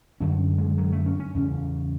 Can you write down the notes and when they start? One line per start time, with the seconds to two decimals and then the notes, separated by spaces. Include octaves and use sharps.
0.20 F#2 D3 C#4
0.58 G#3
0.78 F#3
0.92 A3
1.06 C#4
1.20 C#4
1.35 E2 C#3